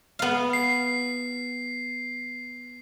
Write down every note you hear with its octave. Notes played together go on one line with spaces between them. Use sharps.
B3 F5
C7